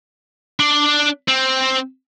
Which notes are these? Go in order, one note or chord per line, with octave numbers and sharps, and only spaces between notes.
D4
C4